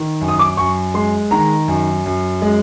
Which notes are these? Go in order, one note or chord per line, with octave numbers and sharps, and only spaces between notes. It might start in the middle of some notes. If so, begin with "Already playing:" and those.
Already playing: D#3
F#2
D#6
D6
F#2 C#6
G#3 C6
D#3 A#5
F#2
F#2
G#3